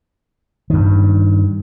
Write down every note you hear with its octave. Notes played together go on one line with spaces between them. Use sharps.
G2 D#3